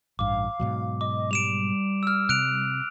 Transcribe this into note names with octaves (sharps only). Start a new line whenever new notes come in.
A1 G2 F5 D6
G#2 B2 F#3
D#5 D6
G3 D7 E7 F7
E6 F6
C3 F#6 D7 F7